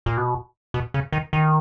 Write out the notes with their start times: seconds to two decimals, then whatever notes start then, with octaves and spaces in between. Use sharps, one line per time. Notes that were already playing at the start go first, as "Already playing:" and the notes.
0.06 A#2
0.17 B2
0.74 B2
0.94 C#3
1.12 D#3
1.33 D#3